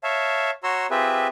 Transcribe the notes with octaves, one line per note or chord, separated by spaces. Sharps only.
C#5 E5 F5 A5
F#4 C#5 A#5 C6 E6
C4 F4 G4 G#4 B4 E5